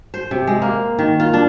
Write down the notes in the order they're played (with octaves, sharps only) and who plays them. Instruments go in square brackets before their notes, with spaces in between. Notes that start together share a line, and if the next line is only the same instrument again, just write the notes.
[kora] C5
C3
G#3
A#3
D#3
F4
D4